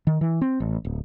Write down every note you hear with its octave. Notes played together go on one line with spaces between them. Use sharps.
D#3
E3
C4
A1
D1